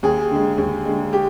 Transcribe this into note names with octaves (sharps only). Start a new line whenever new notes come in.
D#2 G#4
D3 G#3
D#2
D3 G#3
G4